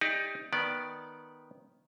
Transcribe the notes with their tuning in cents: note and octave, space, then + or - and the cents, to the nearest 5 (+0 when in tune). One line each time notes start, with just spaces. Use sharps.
D#4 +15 G4 +30 D5 +20
D#3 +0 B3 -10 D5 +0